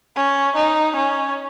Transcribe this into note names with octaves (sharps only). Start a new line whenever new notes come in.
C#4
D#4
C#4